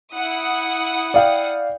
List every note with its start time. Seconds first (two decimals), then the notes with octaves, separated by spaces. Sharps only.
0.14 E4 F#5 D#6
1.14 D5 F5 G5